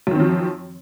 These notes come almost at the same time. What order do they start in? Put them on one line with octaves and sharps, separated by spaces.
F#2 D#3 C4 F3